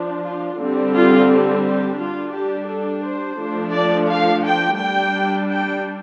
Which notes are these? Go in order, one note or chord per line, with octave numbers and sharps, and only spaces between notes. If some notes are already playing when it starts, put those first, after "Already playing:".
Already playing: F3 D4
F4
D3 G3 C4
F4
G4
G3 D4 F4
G4
A4
C5
F3 A3 D4
D5
F5
G5
G3 D4 G5
G5